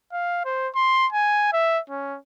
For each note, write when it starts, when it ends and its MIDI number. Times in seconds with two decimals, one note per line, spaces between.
0.13 0.42 77
0.45 0.68 72
0.75 1.07 84
1.13 1.52 80
1.53 1.79 76
1.90 2.18 61